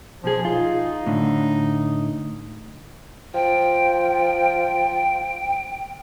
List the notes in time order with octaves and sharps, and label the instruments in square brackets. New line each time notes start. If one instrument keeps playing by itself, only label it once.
[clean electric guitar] B1 G#4 [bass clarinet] F3
[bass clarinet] D#4 [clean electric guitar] F4
[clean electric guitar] A2 D3
[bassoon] F3 [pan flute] G5